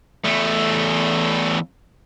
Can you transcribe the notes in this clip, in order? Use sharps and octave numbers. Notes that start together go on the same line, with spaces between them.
E2 A3